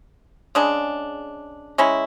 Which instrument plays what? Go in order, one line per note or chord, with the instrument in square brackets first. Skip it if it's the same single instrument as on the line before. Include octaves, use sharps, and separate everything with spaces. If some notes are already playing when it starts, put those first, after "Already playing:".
[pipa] C#3 G#3 D4
G#3 C#4 E4